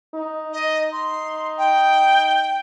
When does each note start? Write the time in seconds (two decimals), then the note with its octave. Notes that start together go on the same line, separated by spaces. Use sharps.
0.15 D#4
0.53 D#5
0.93 C6
1.58 G5